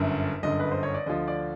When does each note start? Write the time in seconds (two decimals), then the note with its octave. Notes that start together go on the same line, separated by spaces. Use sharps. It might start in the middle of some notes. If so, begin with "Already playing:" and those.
Already playing: G1 F#2 D3 E5
0.43 G1 F#2 D3 D#5
0.60 B4
0.71 C5
0.83 C#5
0.94 D5
1.06 D2 D3 F3 D#5
1.28 D5